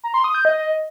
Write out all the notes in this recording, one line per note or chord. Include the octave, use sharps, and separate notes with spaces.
A#5
C6
D#6
G6
D#5